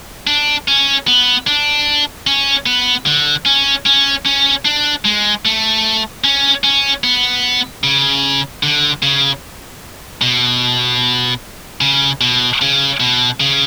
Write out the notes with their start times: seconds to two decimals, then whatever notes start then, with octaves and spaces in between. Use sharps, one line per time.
0.27 D4
0.68 C#4
1.08 B3
1.47 D4
2.27 C#4
2.66 B3
3.06 D3
3.46 C#4
3.86 C#4
4.26 C#4
4.65 D4
5.05 G#3
5.45 A3
6.24 C#4
6.64 C#4
7.04 B3
7.84 C#3
8.63 D3
9.03 C#3
10.22 B2
11.81 C#3
12.21 B2
12.62 C#3
13.00 B2
13.40 C#3